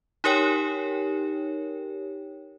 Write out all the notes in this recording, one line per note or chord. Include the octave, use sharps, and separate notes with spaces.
D#4 G4 A#4 C#5 G5